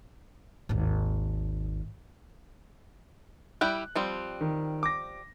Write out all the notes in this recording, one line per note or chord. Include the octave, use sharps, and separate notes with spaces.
G#1 D#2
G3 E4 G4 F#6
F3 G3 C4
D#3
D6 A#6